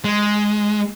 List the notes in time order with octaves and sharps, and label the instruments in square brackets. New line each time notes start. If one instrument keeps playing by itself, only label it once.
[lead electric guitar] G#3